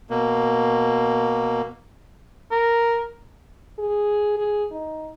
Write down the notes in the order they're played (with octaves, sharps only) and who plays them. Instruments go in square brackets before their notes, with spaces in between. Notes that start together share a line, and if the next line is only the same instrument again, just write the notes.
[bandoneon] B2 A#3
[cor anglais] A#4
[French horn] G#4
G#4
D#4